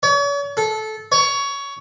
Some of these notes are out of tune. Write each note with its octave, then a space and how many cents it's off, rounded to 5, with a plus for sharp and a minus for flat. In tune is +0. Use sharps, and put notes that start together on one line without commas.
C#5 +40
A4 -20
C#5 +15